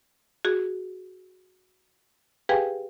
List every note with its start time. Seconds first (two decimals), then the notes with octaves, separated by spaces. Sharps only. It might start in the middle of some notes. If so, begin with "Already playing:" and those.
0.45 F#4 G#4
2.49 G4 G#4 B4 F5 G5 G#5